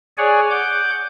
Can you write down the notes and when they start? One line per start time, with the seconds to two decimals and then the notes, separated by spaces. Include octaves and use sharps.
0.18 G#4 C#5 D5 F#5 G#5
0.51 F#5 D6 G6